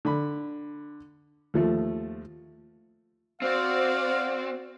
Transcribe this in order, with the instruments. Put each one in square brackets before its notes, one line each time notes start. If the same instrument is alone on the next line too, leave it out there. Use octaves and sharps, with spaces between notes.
[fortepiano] D3 B5
D#2 F3 A3
[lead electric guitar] C4 [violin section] F#4 C5 D5 [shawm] F5